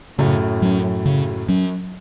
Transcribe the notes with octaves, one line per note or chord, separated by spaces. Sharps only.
F#2 A2 C#3
F#3 C#4
C#3
F#3 C#4